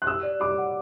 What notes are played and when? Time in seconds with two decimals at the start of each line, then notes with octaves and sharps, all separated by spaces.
0.02 F#6
0.07 G4 E6
0.23 D5
0.40 G4 D6
0.58 F#5